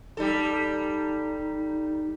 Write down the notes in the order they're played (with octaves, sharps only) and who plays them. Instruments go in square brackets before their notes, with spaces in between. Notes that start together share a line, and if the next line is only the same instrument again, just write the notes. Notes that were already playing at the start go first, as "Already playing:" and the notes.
[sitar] G3 A4 [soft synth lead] D#4